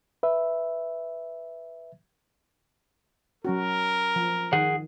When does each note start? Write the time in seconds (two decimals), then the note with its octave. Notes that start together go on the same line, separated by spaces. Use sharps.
0.23 B4 E5
3.45 F#3 C#4 F#4 A#4
4.16 F3
4.53 D#3 G#4 F#5